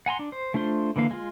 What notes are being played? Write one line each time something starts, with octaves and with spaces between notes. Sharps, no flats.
F#5 G#5 A#5 C6
D4
C5
A3 D4 F4 C5 C6
D3 E3 A#3 F5
G#3 F4